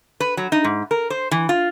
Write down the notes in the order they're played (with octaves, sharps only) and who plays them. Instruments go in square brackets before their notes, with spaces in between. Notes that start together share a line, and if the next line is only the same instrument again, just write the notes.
[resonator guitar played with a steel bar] B4
F#3
D#4
G#2
A#4
C5
E3
F4